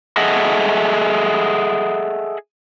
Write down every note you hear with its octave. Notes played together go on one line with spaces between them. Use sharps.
G#4 A4 D#5 E5 F#5